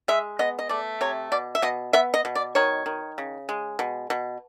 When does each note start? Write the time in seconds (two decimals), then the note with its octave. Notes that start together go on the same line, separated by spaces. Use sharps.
0.08 G#3 E5
0.39 B3 D#5
0.59 D#5
0.69 A3 D5
1.01 C3 C#5
1.32 B2 D5
1.55 E5
1.62 B2 D#5
1.93 B3 E5
2.14 D#5
2.25 B2
2.35 D5
2.55 D#3 C#5
2.86 D#3
3.18 C#3
3.49 G#3
3.79 B2
4.10 B2